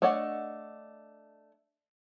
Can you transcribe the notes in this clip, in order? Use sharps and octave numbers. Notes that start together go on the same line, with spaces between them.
A3 D4 C#5 D#5 F#5